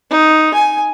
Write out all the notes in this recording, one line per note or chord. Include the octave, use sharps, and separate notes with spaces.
D#4
G#5